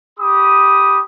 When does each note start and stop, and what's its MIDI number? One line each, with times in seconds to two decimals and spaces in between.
0.19 1.00 67
0.19 1.00 83
0.19 1.00 87